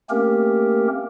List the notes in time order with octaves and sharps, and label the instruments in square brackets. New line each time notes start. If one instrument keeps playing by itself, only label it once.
[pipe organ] A3 A#3 C4 C#4 G4 A#4